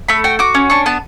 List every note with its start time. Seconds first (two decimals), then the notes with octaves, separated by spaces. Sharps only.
0.08 A3 B5
0.24 F#4 G5
0.39 F#4 D6
0.55 C#4
0.70 D4 C#6
0.86 B3 A5